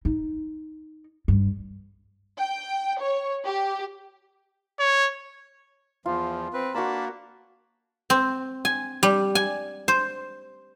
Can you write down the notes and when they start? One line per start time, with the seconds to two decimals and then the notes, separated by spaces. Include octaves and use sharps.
0.05 D#4
1.28 G2
2.40 G5
3.01 C#5
3.45 G4
4.79 C#5
6.06 E2 F3 F4
6.54 C4 B4
6.74 A#3 D4 F#4 A#4 A5 B5
8.10 C4
8.65 G#5
9.03 G3
9.35 G#5
9.88 C5